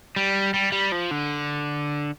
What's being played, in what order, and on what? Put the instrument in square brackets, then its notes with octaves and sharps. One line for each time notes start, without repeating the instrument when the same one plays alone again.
[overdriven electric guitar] G3
G3
G3
F3
D3